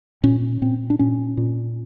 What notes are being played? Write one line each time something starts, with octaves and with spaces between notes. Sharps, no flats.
A#2 C#4
A#2 C4
D4
A#2 C#4
A#2